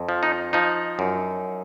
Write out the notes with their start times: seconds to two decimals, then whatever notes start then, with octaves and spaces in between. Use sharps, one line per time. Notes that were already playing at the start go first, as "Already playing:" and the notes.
Already playing: F2
0.09 F3
0.23 D#4
0.53 F3 D#4
0.99 F#2